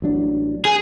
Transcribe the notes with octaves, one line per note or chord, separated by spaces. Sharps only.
A1 F#3 D4
G#4